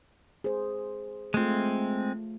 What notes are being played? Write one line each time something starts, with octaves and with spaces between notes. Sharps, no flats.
G#4 C5
G#3 A3 C4 F4